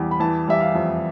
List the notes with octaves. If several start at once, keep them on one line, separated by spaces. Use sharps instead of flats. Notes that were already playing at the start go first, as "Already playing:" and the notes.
Already playing: E2 G3
B5
E3 A5
G3 E5
F5
F2